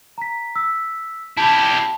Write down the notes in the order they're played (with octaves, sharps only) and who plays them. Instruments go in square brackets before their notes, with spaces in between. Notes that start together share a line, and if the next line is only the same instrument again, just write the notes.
[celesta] A#5 B6
E6 B6
[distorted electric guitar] E4 G4 [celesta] A5 B5